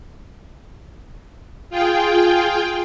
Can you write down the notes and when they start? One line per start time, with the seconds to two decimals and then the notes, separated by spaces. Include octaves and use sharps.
1.70 F4 G#4 G5